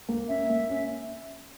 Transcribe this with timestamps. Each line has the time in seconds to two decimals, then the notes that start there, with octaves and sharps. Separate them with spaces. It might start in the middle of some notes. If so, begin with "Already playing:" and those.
0.09 A#3
0.28 C#4 E5
0.49 A#3
0.70 C#4